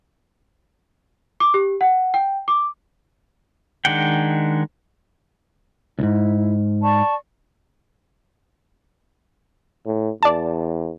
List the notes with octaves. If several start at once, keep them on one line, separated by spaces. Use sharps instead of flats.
D6
G4
F#5
G5
D6
D#3 G#3 D4 F#5 G5
C#2 G#2 E4
D5 A5 C#6
A2
E2 D5 A5